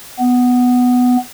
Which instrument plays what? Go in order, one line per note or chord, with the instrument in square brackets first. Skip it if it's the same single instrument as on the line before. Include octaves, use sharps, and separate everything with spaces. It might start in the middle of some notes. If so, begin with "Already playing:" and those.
[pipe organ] B3